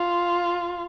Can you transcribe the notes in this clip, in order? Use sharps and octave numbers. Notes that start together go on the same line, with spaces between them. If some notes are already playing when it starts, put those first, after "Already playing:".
Already playing: F4